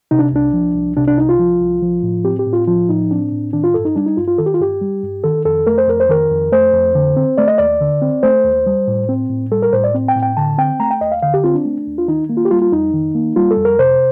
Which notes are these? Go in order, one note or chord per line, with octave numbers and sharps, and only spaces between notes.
C3 D#4
D4
C2 D4
F3
C2
C3 D4
D4
C2 D#4
F4
F3
C2
F3
A2
C4 G4
G4
A2
F4
F3 F4
A2 D#4
C4 D4
A2
D#3 D4
F4
G2 A4
D#4
G3 D4
D#4
G2 F4
F4
D#3 A4
G4
F4
G2 G4
G3
G2
D#3 A4
F2 A4
A3 A#4
C5
F2 A#4
C5
D#3 A#4
F2
A3 C5
F2
D3
C4
A3 D5
D#5
D#2 D5
D3
C4
A3 C5
D#2
G3
A2
C4
A2
G3 A4
A#4
A2 C5
D5
C4
G5
A2
G5
D3 A5
C4 G5
A3 A#5
G5
D#2 D#5
F5
D3 F5
G4
C4 F4
D4
A3
D#2
F4
D#3 D#4
A#3
F4
G4
G3 F4
F4
F2 D#4
D#3
A#3
G3 F4
A4
F2
A#4
C3 C5